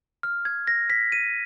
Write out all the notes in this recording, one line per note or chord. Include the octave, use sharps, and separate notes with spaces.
F6
G#6
A#6
B6
D#7